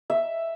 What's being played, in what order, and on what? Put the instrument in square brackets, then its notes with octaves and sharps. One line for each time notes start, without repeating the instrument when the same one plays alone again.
[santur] E5